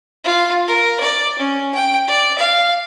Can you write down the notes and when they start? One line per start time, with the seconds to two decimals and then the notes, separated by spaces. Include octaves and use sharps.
0.25 F4
0.68 A#4
1.00 D5
1.39 C#4
1.75 G5
2.07 D5
2.39 F5